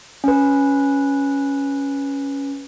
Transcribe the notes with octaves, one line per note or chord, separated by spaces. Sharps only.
C#4 B4